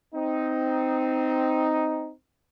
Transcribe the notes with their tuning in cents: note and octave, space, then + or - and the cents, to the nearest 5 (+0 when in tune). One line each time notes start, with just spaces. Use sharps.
C4 -10 D#4 +5